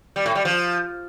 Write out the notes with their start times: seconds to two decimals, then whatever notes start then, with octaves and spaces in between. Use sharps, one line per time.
0.16 G3
0.26 A2
0.35 G3
0.45 F3